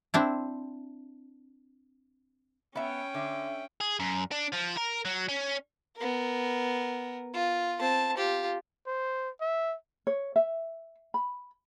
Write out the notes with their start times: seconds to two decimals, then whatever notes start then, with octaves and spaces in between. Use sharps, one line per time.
0.14 C4 D4 E4
2.75 B3 C#4 E5 G5
3.14 D3 E5
3.81 G#4
4.00 F#2
4.31 D4
4.52 F3
4.77 A#4
5.05 F#3
5.29 C#4
5.96 B3 A#4
7.34 F4
7.80 C4 A5
8.17 F4 G4
8.87 C5
9.41 E5
10.07 C#5
10.36 E5
11.14 B5